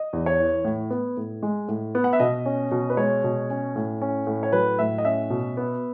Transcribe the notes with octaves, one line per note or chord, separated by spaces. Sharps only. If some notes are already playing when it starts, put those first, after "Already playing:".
Already playing: D#5
E2
C#5
E3
A2
B3
A2
G#3
A2
B3
F#5
E5
B2 D#5
C#4
B2
B4
G#3 C#5
B2
C#4
A2
C#4
A2
C#5
F#3 B4
A2 E5
D#5
C#4 E5
B2
B3